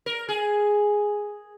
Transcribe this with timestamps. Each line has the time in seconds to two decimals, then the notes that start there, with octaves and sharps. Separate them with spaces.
0.06 A#4
0.29 G#4